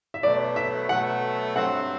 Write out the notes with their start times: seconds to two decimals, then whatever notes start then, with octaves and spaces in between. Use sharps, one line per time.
0.14 E5
0.22 B2 F#3 A3 D5
0.56 E5
0.89 B2 F#3 A3 F#5
1.55 G2 F#3 C4 F#5